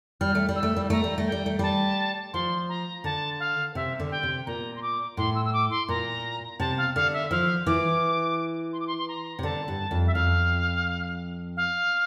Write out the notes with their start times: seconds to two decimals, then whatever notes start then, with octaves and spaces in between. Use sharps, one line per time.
0.21 G3 F6
0.35 A3
0.49 G3
0.56 E6
0.63 A3
0.76 G3
0.90 A3 A#5
1.04 G3
1.18 A3
1.27 G5
1.32 G3
1.46 A3
1.59 G3 A5
2.33 F3 C6
2.69 A#5
3.04 D3 A5
3.40 F5
3.75 C3 E5
4.00 D3
4.11 G5
4.23 C3
4.46 A#2 A#5
4.76 C6
4.82 D6
5.17 A2 C6
5.35 E6
5.45 E6
5.53 D6
5.71 C6
5.89 A#2 A#5
6.60 C3 A5
6.78 F5
6.95 D3 F5
7.13 E5
7.31 F3 F5
7.66 E3 D6
8.73 C6
8.80 D6
8.87 C6
8.98 C6
9.08 A#5
9.39 C3
9.43 D3 A5
9.68 G2
9.91 F2
10.07 E5
10.14 F2 F5
11.57 F5